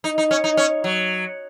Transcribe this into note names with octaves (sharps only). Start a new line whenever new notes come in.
D#4
D#4
C#4
D#4
C#4
F#3